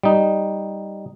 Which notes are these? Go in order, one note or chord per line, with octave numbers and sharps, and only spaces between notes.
G3 D#4